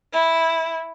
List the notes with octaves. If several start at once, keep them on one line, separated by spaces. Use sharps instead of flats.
E4